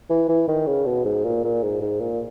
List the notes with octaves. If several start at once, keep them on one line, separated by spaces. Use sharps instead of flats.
E3
E3
D#3
C#3
B2
G#2
A#2
A#2
G#2
G#2
A#2